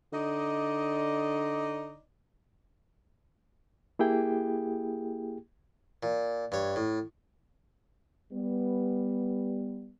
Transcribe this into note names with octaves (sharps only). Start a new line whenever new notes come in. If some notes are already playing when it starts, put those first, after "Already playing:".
D3 D#4 D5 D#5
A#3 E4 G4 G#4 G5
A#2
G2 C#5
A2
G3 B3